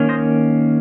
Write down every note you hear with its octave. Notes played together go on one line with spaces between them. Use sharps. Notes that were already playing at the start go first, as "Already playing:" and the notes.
Already playing: D#3 A#3 C#4
C5 D#5